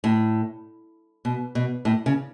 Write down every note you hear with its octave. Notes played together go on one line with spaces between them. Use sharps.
A2
B2
B2
A2
C#3